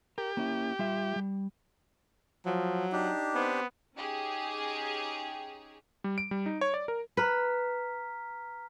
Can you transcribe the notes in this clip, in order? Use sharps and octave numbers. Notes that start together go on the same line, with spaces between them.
G4 A#4
A#3 C#4 E4
G3 F4 E5
G3
F3 F#3
D4 D#4 G4
B3 C4
C#4 D#4 G4 G#4
G3
D7
G3
D#4
C#5
D5
A#4
B4 A#5 F6 B6